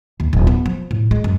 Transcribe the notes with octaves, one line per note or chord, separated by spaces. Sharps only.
D#2
D1
B3
F3
A2
G#3
F#2